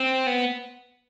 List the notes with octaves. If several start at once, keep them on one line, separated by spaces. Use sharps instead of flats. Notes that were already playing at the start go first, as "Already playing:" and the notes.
Already playing: C4
B3